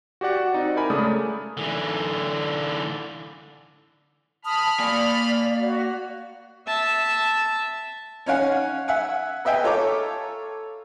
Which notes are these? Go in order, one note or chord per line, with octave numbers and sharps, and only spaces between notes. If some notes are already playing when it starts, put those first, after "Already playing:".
F#4 G4 D5 F#5
F#4
C4 D#4 D5
E4 A#4 G#5 B5
C#3 G#3 A3 D5 A5 D#6
A#4
D3 E3
A5 B5 D#6 F6
A#3 D5 G#5
F#4
E5 A5
C#4 D#4 C#5 F5 F#5 G#5
E5 F#5 G#5
B4 D#5 E5 G5 G#5
F4 A4 C#5 A#5 D6